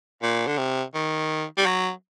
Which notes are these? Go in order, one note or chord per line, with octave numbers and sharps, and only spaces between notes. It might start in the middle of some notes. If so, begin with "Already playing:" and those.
A#2
D3
C3
D#3
G3
F#3